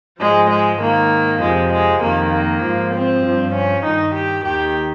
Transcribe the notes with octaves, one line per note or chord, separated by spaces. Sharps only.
G#2 F3 G#3
G#3
G#2 D#3 A#3
F2 C3 F3 G#3
G#3
F2 D#3 A#3
A#3
G#2 F3
C4
G2 F3
C#4
G2 D#3 D#4
G4
D#2 D#3 G4